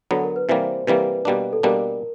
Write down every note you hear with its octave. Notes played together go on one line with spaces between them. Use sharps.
D3 F#3 B3 A4
A#4
B4
C3 E3 G3 A#3 C5
C3 E3 G3 A#3 B4
B2 G3 A#3 D4
A4
B2 G3 A#3 D4 A#4